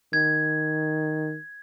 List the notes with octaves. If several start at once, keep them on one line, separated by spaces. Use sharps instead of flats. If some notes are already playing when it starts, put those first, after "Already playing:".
D#3 G#6